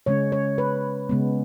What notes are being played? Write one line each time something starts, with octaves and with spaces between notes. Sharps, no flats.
C#3 G#3 C#4 C#5
C#5
B4
C#3 G#3 B3